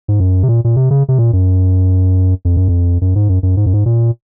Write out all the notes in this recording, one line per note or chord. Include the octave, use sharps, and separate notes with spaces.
G#2
F#2
C3
A#2
A#2
C3
C#3
C3
A#2
F#2
F2
F#2
F2
F#2
G#2
F#2
F#2
G#2
F#2
G#2
A#2